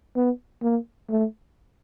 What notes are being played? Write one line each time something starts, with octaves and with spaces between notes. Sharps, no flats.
B3
A#3
A3